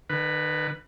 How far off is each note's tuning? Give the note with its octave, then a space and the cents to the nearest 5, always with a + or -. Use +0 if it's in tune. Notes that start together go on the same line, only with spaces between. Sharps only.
D#3 -40 B4 +0